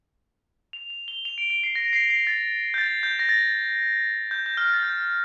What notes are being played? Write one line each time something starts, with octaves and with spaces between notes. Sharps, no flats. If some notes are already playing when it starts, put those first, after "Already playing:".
F7
F7
G7
F7
D7
D7
C7
A#6
C7
C7
A6
G6
A6
G6
A#6
A6
G6
G6
F6
A6
G6